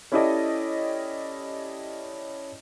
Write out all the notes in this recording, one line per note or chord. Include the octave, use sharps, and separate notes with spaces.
C#4 E4 G4 A4 D5 D#5